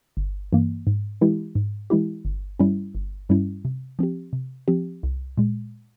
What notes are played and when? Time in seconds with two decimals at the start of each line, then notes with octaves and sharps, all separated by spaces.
0.17 G1
0.53 G2 E3 A#3
0.87 G#2
1.21 E3 G#3 E4 G4
1.55 G#2
1.90 E3 G#3 E4 G4
2.25 G1
2.59 G2 G3 C#4 E4
2.95 G1
3.29 G2 G3 C#4 E4
3.65 C3
3.99 F3 C4 G4
4.33 C3
4.68 F3 C4 G4
5.03 C2
5.37 A#2 G#3